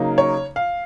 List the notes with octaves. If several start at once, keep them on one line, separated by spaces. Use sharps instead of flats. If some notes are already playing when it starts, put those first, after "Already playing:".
Already playing: C#3 F#3 A#3 D#4
C#5
F5